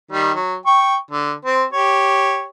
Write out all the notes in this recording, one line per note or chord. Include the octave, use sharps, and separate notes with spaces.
D#3 G3
F#3
G5 C#6
D3
C4 C5
G4 C#5